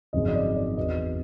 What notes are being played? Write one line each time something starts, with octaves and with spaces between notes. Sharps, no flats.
G#1 F#2 C#3 F3 D#5
D#5
D5
D5
E1 E2 B2 D#5